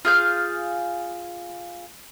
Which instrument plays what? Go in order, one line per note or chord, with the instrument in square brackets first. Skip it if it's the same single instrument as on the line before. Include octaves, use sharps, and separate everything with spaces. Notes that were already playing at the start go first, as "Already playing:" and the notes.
[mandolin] F4 G#4 F5 G6